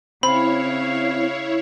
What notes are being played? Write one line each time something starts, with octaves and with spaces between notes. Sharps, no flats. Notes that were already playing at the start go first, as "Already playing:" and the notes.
C#3 C4 E4 C#5 F5 B5